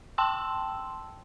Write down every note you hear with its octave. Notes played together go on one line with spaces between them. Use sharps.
G5 A5 C6 E6